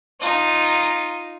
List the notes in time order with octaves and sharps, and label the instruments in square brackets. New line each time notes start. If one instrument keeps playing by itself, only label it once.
[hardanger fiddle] D#4 F4